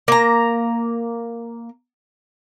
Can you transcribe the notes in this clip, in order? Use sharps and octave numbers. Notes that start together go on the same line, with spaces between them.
A#3 A#5